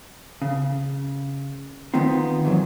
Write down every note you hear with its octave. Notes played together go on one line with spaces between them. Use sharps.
C#3
D#3 B3 C4 D#4 F4
E2 G#2 F#3